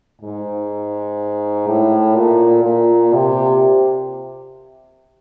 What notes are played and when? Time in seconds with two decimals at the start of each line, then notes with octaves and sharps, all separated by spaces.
0.22 G#2
1.67 A2
2.15 A#2
2.64 A#2
3.13 C3